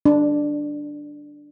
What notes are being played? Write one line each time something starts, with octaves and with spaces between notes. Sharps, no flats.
D4